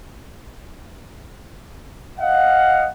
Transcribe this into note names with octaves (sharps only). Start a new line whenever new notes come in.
D#5 F5 F#5